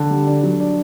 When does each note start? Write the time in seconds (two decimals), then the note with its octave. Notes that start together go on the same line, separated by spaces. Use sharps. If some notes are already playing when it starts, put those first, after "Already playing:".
Already playing: D3
0.10 G3
0.27 D4
0.43 F#3
0.60 D4